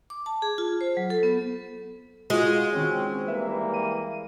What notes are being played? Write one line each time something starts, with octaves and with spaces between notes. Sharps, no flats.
D6
A5
G#4
F4
C5
F#3
A4
B3
G#3 F4 F#4
D#3 C4 C#4 F#4
E3 G3 A#3 B4 E5
D#7